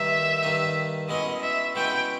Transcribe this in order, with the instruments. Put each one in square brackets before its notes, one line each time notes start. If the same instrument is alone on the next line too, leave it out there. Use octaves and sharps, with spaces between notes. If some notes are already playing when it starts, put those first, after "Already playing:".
Already playing: [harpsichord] G2 D#3 A#3 D#4 [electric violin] E5
[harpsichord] G2 D#3 A#3 D#4
[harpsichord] B2 G#3 C#4 E4 [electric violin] D#5
[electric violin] E5
[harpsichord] B2 G#3 C#4 E4 [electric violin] G5